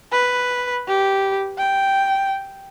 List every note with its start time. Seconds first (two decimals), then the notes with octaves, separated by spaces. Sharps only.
0.12 B4
0.88 G4
1.58 G5